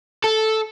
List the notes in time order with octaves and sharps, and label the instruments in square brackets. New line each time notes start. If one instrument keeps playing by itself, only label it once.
[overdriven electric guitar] A4